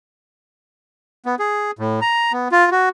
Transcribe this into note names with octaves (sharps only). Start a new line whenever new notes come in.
B3
G#4
A2
A#5
B3
F4
F#4